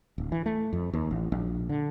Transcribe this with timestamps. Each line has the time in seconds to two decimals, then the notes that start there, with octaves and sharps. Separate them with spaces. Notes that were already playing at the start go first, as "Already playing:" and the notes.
0.18 D1
0.32 E3
0.46 A3
0.73 F2
0.93 D#2
1.11 A1
1.32 A#1
1.69 D3